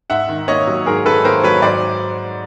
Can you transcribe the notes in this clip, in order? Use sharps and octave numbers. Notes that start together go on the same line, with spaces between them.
G#2 E5 F#5
D#3
A#3 C#5 D#5
F#3
G#2 G#4 A#4
D#3 A4 B4
A#3 A#4 C5
F#3 B4 C#5
G#2 C5 D5